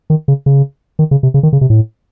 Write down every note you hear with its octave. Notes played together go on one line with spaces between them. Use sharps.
D#3
C#3
C#3
D#3
C#3
C3
C#3
D#3
C#3
C3
A2